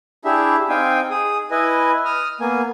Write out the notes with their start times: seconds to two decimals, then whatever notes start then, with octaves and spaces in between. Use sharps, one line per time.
0.25 D4 E4 G4 G#4 E5
0.69 C4 D#4 F5 G5 G#5
1.10 G#4 D#6
1.51 E4 B4 D#5 G#5
2.05 D#6 F6
2.40 A#3 B3 G#5